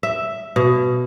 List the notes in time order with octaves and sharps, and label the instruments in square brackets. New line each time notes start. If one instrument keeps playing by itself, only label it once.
[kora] E5
B2